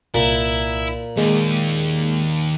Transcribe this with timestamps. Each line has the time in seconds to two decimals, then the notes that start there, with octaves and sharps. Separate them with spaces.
0.14 C2 A#2 E4
1.17 D#2 G#3 A#3